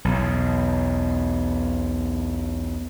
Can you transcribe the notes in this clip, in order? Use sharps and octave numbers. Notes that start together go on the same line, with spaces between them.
B1 E2